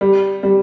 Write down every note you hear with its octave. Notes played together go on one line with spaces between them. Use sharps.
G3
G3